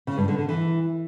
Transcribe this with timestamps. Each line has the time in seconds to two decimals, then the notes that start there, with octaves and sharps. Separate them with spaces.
0.07 C#3
0.18 G2
0.28 D3
0.38 D3
0.49 E3